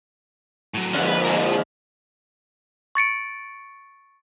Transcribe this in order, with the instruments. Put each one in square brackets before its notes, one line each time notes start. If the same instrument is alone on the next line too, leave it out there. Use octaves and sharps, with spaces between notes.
[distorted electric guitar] A2 F#3
[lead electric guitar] F2 D3 [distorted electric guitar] C#4 F#5
[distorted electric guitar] B4
G#4 A#4
F3
[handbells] C#6 A6 C#7 D7